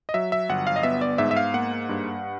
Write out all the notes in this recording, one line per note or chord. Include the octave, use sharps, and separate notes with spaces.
D#5
F#3 E5
E5
G1 F#5
F5
D#5
B3 E5
D5
G#2 E5
E5
F5
A#3 F#5
G2